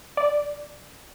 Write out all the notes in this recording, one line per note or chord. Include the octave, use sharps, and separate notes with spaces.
D5